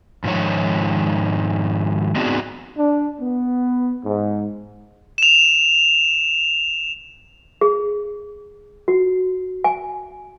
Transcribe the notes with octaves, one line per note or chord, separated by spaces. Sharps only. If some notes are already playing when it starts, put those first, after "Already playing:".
E2 G#2 D#3 F3 C#5
B3 C4 D4 D#4 F#4 G#4
D4
B3
G#2
E7 F7
G#4
F#4
G#5